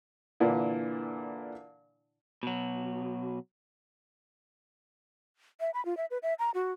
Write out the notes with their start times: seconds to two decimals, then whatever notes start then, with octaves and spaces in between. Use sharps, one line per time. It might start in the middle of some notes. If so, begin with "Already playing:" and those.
0.40 A#2 D3 E3 D4 E4
2.43 B2 F#3
5.60 E5
5.74 B5
5.85 F4
5.97 E5
6.11 B4
6.23 E5
6.39 A#5
6.54 F#4